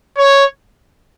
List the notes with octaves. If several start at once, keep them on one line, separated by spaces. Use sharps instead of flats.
C#5